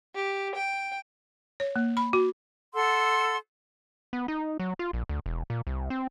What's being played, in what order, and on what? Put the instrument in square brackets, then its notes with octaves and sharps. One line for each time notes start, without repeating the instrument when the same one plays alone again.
[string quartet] G4
G5
[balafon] C#5
A#3
B5
F#4
[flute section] A4 F#5 C6 E6
[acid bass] B3
D#4
F#3
F4
A#1
D2
E1
A#2
C2
C4